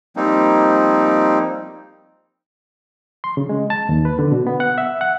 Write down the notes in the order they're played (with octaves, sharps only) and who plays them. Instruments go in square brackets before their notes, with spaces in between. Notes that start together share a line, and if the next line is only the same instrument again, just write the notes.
[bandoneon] F3 G3 A#3 C4 D#4
[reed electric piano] C6
C#3
G#3
A5
D#2
B4
D3
B2
B3
F#5
E5
F#5